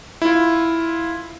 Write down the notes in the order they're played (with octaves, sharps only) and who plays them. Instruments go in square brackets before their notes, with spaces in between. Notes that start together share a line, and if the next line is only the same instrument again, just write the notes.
[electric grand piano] E4 F4